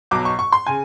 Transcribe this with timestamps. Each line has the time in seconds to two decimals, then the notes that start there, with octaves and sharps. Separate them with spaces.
0.11 B1 B2 F#3 D6
0.25 C#6
0.39 C#6
0.52 C6
0.67 C#3 G#5